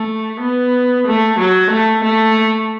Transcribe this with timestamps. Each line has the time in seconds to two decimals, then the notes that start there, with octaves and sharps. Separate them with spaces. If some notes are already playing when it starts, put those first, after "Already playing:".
Already playing: A3
0.41 B3
1.07 A3
1.39 F#3
1.71 A3
2.04 A3